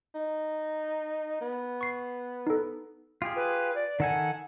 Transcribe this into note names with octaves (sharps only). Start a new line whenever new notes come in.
D#4
B3
C#6 C7
D#4 A4
F4 G4 G#4
B4
D5
D#3 A4 F#5 G#5